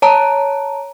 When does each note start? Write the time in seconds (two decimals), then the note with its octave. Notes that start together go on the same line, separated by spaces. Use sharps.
0.02 C#5 A5 A#5